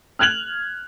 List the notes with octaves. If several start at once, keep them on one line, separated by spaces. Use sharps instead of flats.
F6 F#6 G#6 F7 F#7